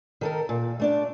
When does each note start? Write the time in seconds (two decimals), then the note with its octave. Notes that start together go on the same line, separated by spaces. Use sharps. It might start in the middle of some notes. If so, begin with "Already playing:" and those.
0.21 D#3 A4 A#4
0.49 A#2
0.80 A3 D4 D5